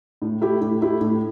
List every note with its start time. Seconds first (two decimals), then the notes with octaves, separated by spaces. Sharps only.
0.22 A2
0.41 A3 E4 G4
0.61 A2
0.81 A3 E4 G4
1.01 A2